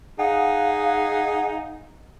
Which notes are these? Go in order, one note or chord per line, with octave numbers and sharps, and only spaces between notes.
D#4 G#4 F5 F#5